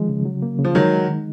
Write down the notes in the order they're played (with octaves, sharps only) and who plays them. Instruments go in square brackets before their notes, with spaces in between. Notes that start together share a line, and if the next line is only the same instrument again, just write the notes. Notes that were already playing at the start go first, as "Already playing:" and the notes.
Already playing: [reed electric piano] D#3 F3 G#3
C#3
F#3
A#3
C#3
[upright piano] F3
[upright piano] D#3 F#3 [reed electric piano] G#3
[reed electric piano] D#4
D#3